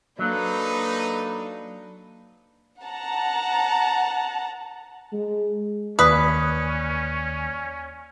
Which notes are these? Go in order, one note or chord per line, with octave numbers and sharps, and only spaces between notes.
F#3 A#3 D4 D#4 A4 B4
F#5 A5 A#5
G#3
D#2 C#4 B4 D5 D#6